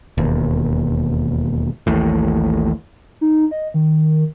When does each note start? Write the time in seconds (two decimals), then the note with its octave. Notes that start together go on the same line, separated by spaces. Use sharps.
0.18 E1 D#2
1.87 A1 D#2 A2
3.21 D#4
3.51 D#5
3.74 D#3